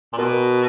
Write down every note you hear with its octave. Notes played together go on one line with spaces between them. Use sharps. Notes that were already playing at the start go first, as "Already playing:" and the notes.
A#2
B2 A#4